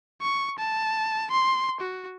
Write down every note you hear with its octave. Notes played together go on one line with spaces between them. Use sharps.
C#6
A5
C6
F#4